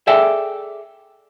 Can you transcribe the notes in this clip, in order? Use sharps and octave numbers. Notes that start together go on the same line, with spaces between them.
G#4 A4 D5 E5 G5